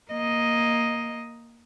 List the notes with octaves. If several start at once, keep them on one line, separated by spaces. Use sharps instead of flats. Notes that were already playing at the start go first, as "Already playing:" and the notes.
A#3 D#5